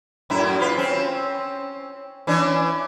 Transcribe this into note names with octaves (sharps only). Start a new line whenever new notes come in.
F#2 A2 E4
F4 B4
C4 C#4
E3 C#4 D4